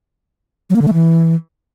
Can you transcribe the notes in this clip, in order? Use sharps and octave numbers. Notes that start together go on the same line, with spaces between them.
F#3
A#3
D3
A3
E3